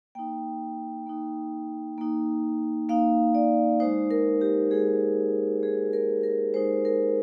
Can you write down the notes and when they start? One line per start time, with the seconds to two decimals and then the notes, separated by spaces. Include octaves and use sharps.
0.15 A#3 D#4 G5
1.06 A#3 D#4
1.98 A#3 D#4
2.89 A#3 D#4 F5
3.35 D5
3.80 G#3 D#4 C5
4.11 A#4
4.41 G4
4.71 G#3 D#4 G#4
5.63 G#3 D#4 G#4
5.93 A#4
6.23 A#4
6.54 G#3 D#4 C5
6.85 A#4